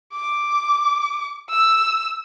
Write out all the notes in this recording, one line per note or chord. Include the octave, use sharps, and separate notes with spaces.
D6
E6